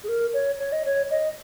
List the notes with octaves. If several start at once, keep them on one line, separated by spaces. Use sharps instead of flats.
G#4
A#4
C#5
C#5
D#5
C#5
D#5